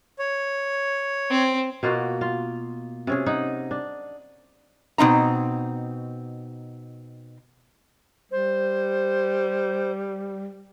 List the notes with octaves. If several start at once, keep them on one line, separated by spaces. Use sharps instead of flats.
C#5
C4
B2 A#3 F4 F#4
F4
C3 C#4 G#4
D#4 F#5
D4
B2 C4 D#4 A#5
G3 C5